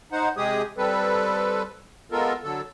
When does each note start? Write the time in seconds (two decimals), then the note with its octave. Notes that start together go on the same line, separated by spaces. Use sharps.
0.12 D#4 C5 F#5
0.37 C3 G#3 G4 G#4 D#6
0.77 G3 C4 A4 B4
2.12 G#3 B3 F4 A4 A#4
2.43 D3 F#3 A4